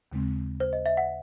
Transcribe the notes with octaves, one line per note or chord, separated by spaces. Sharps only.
D#2 C#3 G#3 C4
C5
D#5
E5
F#5